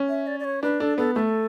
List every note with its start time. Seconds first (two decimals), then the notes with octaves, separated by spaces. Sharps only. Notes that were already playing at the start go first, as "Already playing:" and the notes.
Already playing: C#4
0.09 E5
0.27 D5
0.40 D5
0.44 C#5
0.63 D4 B4
0.80 D4 A4
0.98 B3 A4
1.15 A3 A4